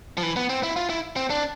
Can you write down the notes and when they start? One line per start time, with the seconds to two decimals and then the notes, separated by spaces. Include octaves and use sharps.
0.17 F3
0.23 E3
0.36 B3
0.50 C4
0.63 E4
0.76 F4
0.89 E4
1.16 C4
1.30 D4